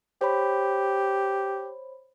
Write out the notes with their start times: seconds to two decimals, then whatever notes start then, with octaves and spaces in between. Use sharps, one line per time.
0.21 G4 C5 C#5 B5